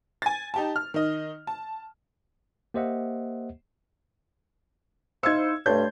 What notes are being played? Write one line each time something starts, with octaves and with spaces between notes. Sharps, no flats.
G#5 A6
D#4 G4 A5
F6
D#3 D#5
A5
A#3 G4 C5 D#5 E5 F#5
D#4 E4 C5 F5 E6 G#6 C#7
G2 A3 C#5 A5 C6 G6